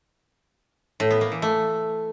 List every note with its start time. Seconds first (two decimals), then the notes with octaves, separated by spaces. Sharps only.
1.00 A2
1.11 B3
1.21 A#3
1.32 E3
1.42 A3